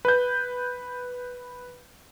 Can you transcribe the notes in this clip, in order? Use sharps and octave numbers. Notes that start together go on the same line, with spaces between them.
B4 G6